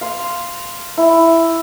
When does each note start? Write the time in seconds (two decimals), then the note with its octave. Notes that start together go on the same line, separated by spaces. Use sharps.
0.01 F5 C6
0.98 E4